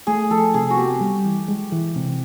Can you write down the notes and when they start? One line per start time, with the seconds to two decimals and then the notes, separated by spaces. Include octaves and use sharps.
0.07 A3 G#4
0.31 F3 A4
0.54 C3 G#4
0.70 F#4
0.77 B3 G4
1.01 G3
1.25 E3
1.48 G#3
1.72 E3
1.96 C3